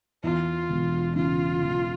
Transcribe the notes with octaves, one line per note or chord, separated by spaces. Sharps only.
E2 F4
E1
C#3 F4
E1